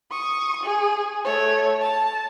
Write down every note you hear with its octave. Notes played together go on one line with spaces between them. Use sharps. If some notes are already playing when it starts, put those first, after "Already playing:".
C#6 D#6
G#4
A3 C#5
A5